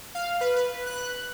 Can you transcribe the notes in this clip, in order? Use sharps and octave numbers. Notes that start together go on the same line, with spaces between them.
F5
B4
B4
F#6